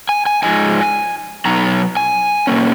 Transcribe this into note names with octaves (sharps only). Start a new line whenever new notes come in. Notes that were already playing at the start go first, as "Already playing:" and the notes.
G#5
G#5
G#2 F3 G#3 D#4 G#5
B2 F#3 B3 D#4 A#5
G#5
B2 A#3 C#4